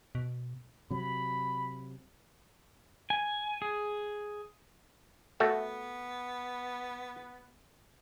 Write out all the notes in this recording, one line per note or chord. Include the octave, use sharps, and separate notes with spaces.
B2
C3 F#3 B5
G#5
G#4
A3 B3 F#4 A4